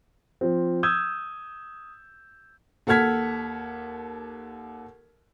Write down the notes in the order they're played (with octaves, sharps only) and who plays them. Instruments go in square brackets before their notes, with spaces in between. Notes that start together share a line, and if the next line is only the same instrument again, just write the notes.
[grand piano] F3 C4
D#6 E6 G6 G#6
[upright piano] D#2 A4 F#5 F6 G#6 B6